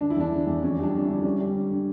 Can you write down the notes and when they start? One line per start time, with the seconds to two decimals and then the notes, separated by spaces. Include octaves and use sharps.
0.01 D3 D4
0.10 E4
0.17 E2 D4
0.32 D3
0.47 E2
0.62 F2 C#4
0.79 G3 D4
0.94 F2
1.04 D3 E4
1.24 G3 C#4
1.40 G3
1.55 D3
1.71 D3